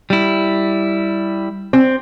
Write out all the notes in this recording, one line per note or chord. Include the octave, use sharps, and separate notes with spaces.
G3 E4
C4